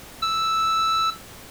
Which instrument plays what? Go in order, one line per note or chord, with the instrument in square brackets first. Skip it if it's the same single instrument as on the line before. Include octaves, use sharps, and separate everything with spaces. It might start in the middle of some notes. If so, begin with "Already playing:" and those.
[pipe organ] E6